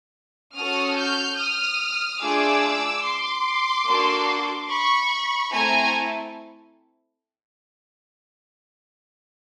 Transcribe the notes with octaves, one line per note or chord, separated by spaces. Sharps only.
C#4 F#4 A4 D#6 F6
F6 G6
D#6 F6
A3 D4 F4 G#4 D6 E6
C6 D6
A#3 D4 F#4 A4
B5 C#6
A3 C4 E4 A4 G#5 A#5